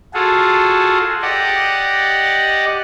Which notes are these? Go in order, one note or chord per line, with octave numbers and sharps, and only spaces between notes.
F4 F#4 G#4 A4
G4 D5 D#5 F#5